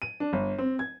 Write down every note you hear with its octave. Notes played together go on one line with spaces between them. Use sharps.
D#7
D4
G1
C4
G#6